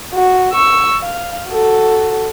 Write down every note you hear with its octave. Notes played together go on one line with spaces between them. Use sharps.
F#4
C#6 E6
F5
F#4 A4